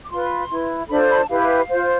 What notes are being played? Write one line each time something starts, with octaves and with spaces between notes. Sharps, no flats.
D6
F4 B4 C6
E4 B4
D4 F4 A4 C5 B5
B5
A5
E4 G4 B4 F5
F4 C5